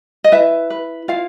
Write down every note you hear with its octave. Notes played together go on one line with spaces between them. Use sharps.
D#5
E4 B4 E5
B4
E4 F4 F5